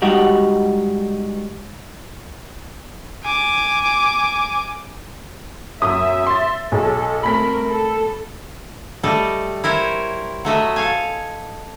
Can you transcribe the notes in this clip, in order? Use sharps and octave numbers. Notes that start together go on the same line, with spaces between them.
G#2 G3 D#4 F#4
G#5 D6
F#2 E5 D#6 B6
C6 A6
B1 G#4 A4
A3 C4 A#4 B5 B6
A4
G3 A3 A4 D#5
E4 A#4 C5 C#5
F#3 A3 D#5 E5
A4 F5 G#5